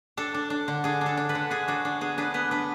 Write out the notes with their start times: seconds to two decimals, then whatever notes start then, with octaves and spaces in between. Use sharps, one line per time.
0.17 D4 A4
0.34 D4
0.50 D4
0.68 D3
0.84 D4 G#4
1.01 D4
1.06 A4
1.17 D4
1.29 B4
1.35 D3
1.50 D4 G#4
1.68 D4 F#4
1.85 D4
2.01 B3 G#4
2.18 D4 B4
2.34 B3 B4
2.51 D4 B4